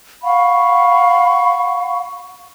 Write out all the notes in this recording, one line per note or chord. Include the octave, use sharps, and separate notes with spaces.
F5 F#5 B5 C#6